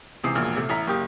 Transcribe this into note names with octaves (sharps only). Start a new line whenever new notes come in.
C#2 C3 E3 D#6 C7
E1 A#1 A#2 F6
C3 A3
A1 E4 A#5 B6
F#1 A#3 G4 D#6